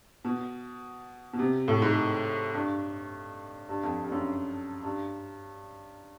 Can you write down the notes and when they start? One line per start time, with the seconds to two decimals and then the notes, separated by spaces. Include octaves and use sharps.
0.25 B2
1.33 B2
1.39 C3
1.68 A2
1.82 G#2
2.54 G2
3.69 G2
3.84 F2
4.04 G2
4.12 F#2
4.84 G2